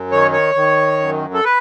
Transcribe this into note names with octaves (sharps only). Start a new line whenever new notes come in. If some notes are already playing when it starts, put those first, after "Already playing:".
Already playing: F#2
D#3 C#5
C#5
D#3
F#2
A4
B4